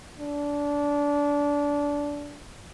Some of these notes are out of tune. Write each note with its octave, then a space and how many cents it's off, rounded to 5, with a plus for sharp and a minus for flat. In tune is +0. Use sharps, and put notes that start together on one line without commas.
D4 -20